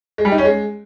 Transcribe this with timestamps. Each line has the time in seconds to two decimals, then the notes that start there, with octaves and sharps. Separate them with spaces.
0.18 G#3
0.25 G3
0.32 D#4
0.38 C#4
0.45 G#3